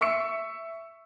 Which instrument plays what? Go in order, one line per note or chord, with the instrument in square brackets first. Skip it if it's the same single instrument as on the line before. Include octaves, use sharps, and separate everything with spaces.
[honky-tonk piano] E5 C#6 E6 C#7